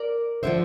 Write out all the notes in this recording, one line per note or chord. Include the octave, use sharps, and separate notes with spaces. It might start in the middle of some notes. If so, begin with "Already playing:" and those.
Already playing: A#4 D5
D3 F3 C5 E5